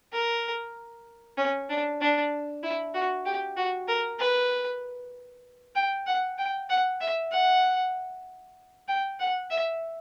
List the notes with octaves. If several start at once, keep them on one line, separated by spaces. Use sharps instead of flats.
A#4
C#4
D4
D4
E4
F#4
G4
F#4
A#4
B4
G5
F#5
G5
F#5
E5
F#5
G5
F#5
E5